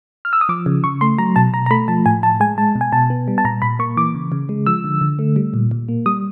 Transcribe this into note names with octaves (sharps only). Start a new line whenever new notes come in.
F6
E6
D#6
F3 D6
C#3
C#3 C#6
A3 C6
F#3 A#5
B2 A5
B2 A#5
A#5
A3 B5
F3 A5
A2 G#5
A2 A5
G#3 G#5
G#3 A5
B2
G#5
B2 A5
B3
G3
A5
A#2 A#5
A#2 B5
A#3 C#6
E3 D6
C#3
C#3
G#3
F3 E6
D3
D3
A3
G3
A#2
A#2
A#3
G3 D#6